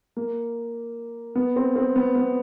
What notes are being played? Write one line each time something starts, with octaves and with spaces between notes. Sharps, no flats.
A#3
B3
C4
C4
B3
B3